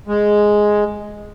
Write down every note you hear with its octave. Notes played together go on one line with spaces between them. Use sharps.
G#3